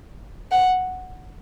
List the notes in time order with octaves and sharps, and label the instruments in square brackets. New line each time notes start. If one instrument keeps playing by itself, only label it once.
[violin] F#5